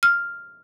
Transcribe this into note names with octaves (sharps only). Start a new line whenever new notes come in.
F6